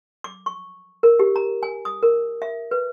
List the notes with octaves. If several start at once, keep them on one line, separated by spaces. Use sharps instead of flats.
D6
C#6
A#4
G4
A#5
G#5
D#6
A#4
E5
B4